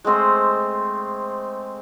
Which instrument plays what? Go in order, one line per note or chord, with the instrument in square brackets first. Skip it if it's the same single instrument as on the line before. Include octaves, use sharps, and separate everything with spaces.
[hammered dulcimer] G#3 A3 C4 C5